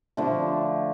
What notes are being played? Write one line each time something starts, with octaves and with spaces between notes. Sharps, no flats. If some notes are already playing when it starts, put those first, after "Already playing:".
D3 F3 A3